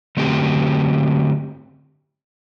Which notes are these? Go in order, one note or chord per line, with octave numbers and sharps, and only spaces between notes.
D3 F#3 A3 C4 G4